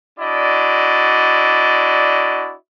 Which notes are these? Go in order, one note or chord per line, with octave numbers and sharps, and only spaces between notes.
D4 E4 F#4 D5 D#5